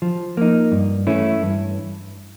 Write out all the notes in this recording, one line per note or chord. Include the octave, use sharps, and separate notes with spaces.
F3
A#3 D#4
G2
E3 A3 C#4 E4
G2